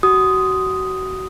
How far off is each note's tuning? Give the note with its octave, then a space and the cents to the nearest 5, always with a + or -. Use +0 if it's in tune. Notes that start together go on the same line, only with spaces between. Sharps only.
F#4 +30 D#6 +0